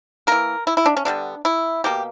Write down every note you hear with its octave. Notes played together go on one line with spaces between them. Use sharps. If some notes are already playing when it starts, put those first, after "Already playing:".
E3 A#3 A#4
E4
E4
D4
C#4
D3 G3 B3 D4
E4
B2 A#3 G4